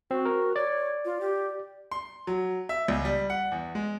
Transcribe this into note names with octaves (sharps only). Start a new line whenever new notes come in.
C4 F#4
A#4
C#5 D5
F4
G4
C6
F#3
E5
C#2
G3
F#5
E2
G#3